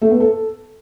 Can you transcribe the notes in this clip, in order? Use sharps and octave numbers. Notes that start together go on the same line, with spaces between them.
A3
B3
A4